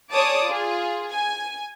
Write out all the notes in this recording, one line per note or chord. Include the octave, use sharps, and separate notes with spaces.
G#4 C#5 D5 A5 D6 D#6
F4 G#4
G#5